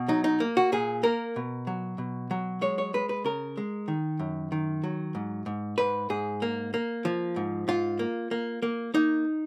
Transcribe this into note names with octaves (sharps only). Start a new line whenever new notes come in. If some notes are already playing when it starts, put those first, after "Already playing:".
Already playing: B2
F#3 D#4
D#4
A#3
F#4
A#2 G#4
A#3 A#4
B2
F#3
B2
F#3
G#3 C#5
C#5
G#3 B4
B4
C#3 A#4
G#3
D#3
F#2
D#3
F#3
G#2
G#2
G#2 B4
G#2 G#4
A#3
A#3
F3
G#2
G#2 F4
A#3
A#3
A#3
A#3 D#4